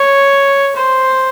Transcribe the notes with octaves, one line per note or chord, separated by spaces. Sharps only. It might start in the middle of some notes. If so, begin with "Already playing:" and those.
Already playing: C#5
C5